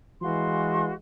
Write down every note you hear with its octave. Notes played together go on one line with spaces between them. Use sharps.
E3 G#3 F#4 F5 C6